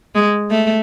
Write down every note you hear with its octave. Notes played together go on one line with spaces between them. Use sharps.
G#3
A3